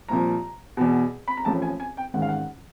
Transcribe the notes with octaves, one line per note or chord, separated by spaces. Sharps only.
C2 A#2 F3 A#5
E2 B2
B5
A#5
A1 A2 F3 A5
G#5
G#5
G5
A1 G#2 D#3 F#5
F5
F#5